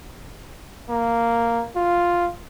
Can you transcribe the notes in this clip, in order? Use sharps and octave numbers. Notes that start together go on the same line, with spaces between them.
A#3
F4